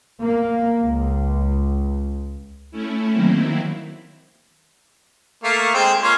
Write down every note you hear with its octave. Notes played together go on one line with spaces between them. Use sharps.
A#3
C#2
A3 C#4 E4
D#3 F#3 A#3 C4 E4
A3 A#3 F5
G#3 C4
A#3 C#4 F4